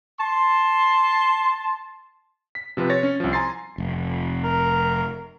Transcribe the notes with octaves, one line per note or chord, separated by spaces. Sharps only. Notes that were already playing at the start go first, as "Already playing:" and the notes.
A5 C6
B6
C3 F3 C4 B4
C#5 A6 A#6
C#4
C2 F3
G#5 A#5 C6 A6 C7
F1
A#4